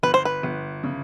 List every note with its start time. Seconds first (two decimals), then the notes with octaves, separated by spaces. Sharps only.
0.03 G1 B4
0.14 C5
0.25 B4
0.43 G1
0.84 C#3